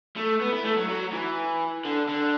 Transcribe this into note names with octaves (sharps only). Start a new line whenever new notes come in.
A3
B3
E4
A3
F#3
F#3
E3
D3
D3